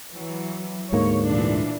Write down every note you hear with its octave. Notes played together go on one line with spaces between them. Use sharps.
E3 F#3
D2 G#2 A#3 C#5
A#2 E3 D4